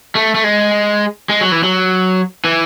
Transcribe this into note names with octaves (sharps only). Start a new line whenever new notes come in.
A3
A3
G#3
G#3
F#3
E3
F#3
E3